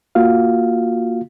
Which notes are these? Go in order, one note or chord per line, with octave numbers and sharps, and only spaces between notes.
A#3 F4 F#4 F5